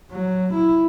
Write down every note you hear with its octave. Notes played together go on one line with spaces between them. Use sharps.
F#3
E4